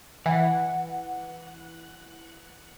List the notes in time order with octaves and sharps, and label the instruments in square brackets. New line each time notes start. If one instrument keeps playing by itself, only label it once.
[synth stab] E3 [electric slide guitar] F#5